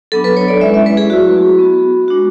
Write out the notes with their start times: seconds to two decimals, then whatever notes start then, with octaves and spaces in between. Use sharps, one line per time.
0.12 F#3 B3 D4 A4
0.24 B4
0.37 C#5
0.48 D5
0.61 G#3 C#4 E4 E5
0.74 E5
0.86 B4
0.97 G#4
1.10 F#3 A3 E4 F#4
1.59 B3 F#4
2.08 G#3 D4 F#4